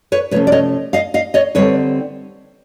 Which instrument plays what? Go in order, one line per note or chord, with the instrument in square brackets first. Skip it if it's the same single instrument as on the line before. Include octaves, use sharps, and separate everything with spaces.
[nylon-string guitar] B4 C#5
C3 F3 A3 C#4 B4 C#5
D5
C#5 D#5
D#5 F5
D#5 F5
C#5 D#5
D3 G3 C4 D#4 B4 C#5